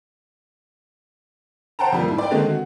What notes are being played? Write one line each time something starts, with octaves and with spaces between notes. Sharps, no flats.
C5 F#5 G5 A5 A#5
F2 G3 A#3
G#2 E4
D5 G5
D3 D#3 G#3 A3 C4 D#4
F#4